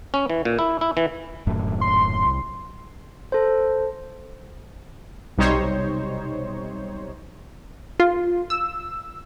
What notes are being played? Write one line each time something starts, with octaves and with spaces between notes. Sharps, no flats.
C#4
E3
A#2
E4
E4
E3
D#1 F#2 A2
C6
C2
A4 C5
B1 C3 G3 D#4 C5 C#5
F4
E6